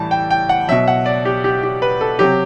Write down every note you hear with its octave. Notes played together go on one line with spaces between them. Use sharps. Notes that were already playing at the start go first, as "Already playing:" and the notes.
Already playing: A2 E3 G3 A5
G5
G5
F#5
B2 F#3 E5
F#5
D5
G4
G4
G4
B4
A4
C3 F#3 G4